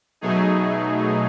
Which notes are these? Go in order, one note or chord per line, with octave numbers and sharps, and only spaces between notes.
B2 F#3 A3 D#4 G#4